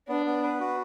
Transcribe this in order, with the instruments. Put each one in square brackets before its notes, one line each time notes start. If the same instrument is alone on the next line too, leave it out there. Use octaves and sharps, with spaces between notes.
[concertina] B3 [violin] D4
[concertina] B3
B4
F#4